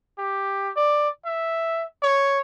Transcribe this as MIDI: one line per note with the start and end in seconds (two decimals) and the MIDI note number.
0.18 0.71 67
0.76 1.09 74
1.25 1.84 76
2.02 2.39 73